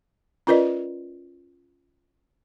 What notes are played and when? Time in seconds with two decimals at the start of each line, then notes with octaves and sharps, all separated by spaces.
0.47 C#4 F4 A#4 B4 D5 D#5